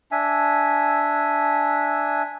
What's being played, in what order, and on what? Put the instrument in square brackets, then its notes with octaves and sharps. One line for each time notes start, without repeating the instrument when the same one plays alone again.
[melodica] D4 E5 G#5